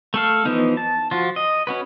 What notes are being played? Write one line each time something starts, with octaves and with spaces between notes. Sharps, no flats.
A3 A4 F5
E3 F3 B3 D#4
A5
F3 F4 F#4
D#5
C#4 F#4 B4